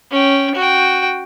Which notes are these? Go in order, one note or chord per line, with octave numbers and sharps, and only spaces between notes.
C#4 G5
F#4 G5